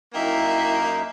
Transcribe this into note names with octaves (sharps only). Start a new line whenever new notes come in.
F#2 A#3 D#4 E4 E5 G5